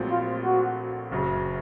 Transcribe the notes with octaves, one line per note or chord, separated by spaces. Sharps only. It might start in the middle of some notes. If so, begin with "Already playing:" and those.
Already playing: A#1 A#2 F#3 A3 C4
F4
F#4
F#1 F#2 C#3 F#3